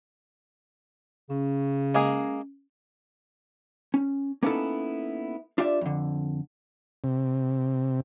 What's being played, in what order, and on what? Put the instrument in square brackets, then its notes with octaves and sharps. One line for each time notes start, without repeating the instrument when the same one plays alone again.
[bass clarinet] C#3 [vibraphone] C#4
[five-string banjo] G#3 A#3 G#4
[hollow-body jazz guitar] C#4
A#3 B3 C#4 D#4 E4 A4
D4 F4 G4 D5 E5
F2 D3
[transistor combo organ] C3